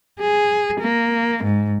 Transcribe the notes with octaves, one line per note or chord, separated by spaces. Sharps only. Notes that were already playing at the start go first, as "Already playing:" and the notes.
G#4
A#3
G#2